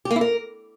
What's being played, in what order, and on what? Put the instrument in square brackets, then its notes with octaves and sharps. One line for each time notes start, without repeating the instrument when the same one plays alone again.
[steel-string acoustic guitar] G4
A#3
E4
A#4